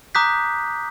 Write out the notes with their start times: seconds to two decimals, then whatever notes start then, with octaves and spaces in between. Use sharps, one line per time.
0.15 A#5 D6 D#6 F#6 G6 B6